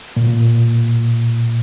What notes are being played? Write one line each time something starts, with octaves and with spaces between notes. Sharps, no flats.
A#2